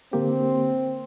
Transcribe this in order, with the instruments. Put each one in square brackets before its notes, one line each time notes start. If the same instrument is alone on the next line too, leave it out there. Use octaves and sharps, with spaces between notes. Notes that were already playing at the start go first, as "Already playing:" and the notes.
[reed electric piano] D3 A#3 G4 [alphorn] C4